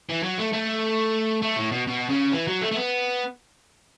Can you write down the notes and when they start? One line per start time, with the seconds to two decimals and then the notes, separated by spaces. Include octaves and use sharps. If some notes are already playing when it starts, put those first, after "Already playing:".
0.09 E3
0.23 F#3
0.38 A3
0.53 A3
1.42 A3
1.57 A2
1.72 B2
1.87 B2
2.09 C#3
2.32 E3
2.47 F#3
2.61 A3
2.72 A3
2.77 B3